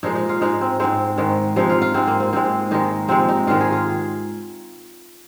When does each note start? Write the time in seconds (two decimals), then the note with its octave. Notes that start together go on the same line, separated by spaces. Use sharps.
0.03 A#2 F3 G#3 D#4
0.15 D#4
0.29 F4
0.41 G#2 G#3 D#4
0.61 C4
0.79 G#2 G#3 C4
1.18 G#2 D#3 G#3
1.56 C3 F3 G#3 D#4
1.70 F4
1.82 F4
1.94 G#2 G#3 C4
2.07 A#3
2.20 C4
2.33 G#2 G#3 C4
2.71 G#2 D#3 G#3 D#4
3.09 C3 F3 G#3 C4
3.29 D#4
3.47 G#2 D#3 G#3 F4
3.61 G#4
3.73 F4